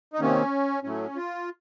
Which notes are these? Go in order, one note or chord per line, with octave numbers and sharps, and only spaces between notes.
D#4
C3 D#3 A#3 C#4
A2 F#3 A3 C#4
F4